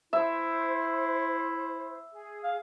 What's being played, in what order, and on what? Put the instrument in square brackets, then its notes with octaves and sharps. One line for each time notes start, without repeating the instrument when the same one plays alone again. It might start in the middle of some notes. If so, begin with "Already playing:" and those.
[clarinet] E4 [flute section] C5 [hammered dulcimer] E5
[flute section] G#4
[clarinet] F5